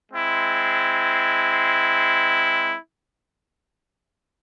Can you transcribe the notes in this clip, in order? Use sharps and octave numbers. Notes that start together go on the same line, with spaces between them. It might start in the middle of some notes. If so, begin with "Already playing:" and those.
G#3 C4 E4